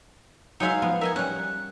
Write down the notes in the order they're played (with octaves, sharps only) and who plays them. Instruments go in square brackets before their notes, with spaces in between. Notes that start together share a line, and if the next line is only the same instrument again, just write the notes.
[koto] F#3 G#3 E5 [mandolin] D#4 G#4 F5
[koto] F3 B3
[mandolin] A#4 D#5 G#5 [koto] E5
[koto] G3 C#4 [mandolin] F#5